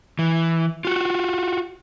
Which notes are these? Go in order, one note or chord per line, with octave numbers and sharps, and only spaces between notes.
E3
F4 F#4